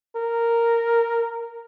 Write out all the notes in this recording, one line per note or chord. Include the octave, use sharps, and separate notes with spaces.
A#4